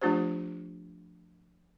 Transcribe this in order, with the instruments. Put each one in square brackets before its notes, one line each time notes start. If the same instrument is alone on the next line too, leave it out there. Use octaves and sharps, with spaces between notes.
[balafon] F3 A3 D4 F4 G4 C5